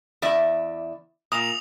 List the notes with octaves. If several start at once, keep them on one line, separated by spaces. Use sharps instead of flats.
E2 D5 E5
A#2 D#6 F7